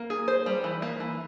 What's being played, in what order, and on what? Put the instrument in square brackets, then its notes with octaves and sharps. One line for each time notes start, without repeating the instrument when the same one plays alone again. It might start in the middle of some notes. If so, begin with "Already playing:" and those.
Already playing: [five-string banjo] A#3
G#4
C5
G3
E3
A#3
E3